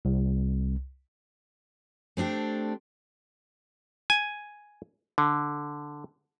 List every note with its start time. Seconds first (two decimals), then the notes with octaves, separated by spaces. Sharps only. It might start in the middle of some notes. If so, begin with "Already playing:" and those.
0.05 C2
2.17 A3 C4 D4 G4
4.10 G#5
5.18 D3